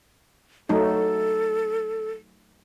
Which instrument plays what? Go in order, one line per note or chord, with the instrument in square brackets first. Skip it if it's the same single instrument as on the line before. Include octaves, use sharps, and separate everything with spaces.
[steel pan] F#3 A3 D#4 [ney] A4